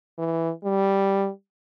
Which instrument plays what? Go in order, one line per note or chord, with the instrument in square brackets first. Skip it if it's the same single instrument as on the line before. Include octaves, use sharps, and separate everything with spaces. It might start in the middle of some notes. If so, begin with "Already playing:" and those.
[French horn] E3
G3